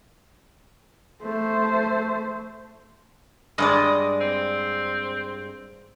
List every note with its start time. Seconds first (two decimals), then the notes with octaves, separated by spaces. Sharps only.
1.23 A3 C5
3.58 G2 G#3 D5 D#5
4.21 C4